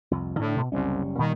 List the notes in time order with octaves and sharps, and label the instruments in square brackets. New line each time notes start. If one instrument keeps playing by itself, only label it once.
[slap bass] C2 F2
[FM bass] A2 [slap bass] D3 D4
[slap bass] B2
[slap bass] F#1 G3 C#4 [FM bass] C2
[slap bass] A#2 G3 [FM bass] D#3